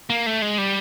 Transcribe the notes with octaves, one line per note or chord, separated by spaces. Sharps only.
A#3
A3
G#3
G3